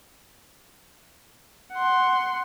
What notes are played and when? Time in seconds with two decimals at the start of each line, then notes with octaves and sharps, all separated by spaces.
1.73 F#5 C6